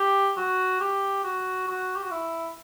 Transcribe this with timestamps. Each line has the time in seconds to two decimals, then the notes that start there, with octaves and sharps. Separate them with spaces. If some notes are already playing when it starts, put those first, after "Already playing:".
Already playing: G4
0.37 F#4
0.81 G4
1.24 F#4
1.68 F#4
1.96 G4
2.03 F#4
2.11 E4